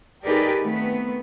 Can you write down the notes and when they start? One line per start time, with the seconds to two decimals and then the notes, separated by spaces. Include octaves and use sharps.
0.24 D#4 G4 G#4 A#4 B4 D5
0.62 D#3 A3 B3 C4 B4